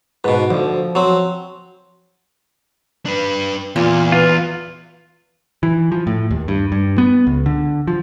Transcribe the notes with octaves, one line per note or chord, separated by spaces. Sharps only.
G#2 B2 B4
D2 F3
F#3 C4
D4 B4
E2 A#2 F4
F4 B4
E3
F3
A2
D#2
G2
G2
B3
C#2
D3
F3